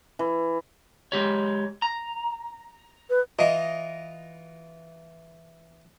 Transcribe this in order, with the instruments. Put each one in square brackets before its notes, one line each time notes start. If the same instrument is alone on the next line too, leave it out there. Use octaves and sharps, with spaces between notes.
[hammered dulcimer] E3
[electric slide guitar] G#3 G4 C#5
A#5
[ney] B4
[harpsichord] E3 F4 [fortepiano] D#5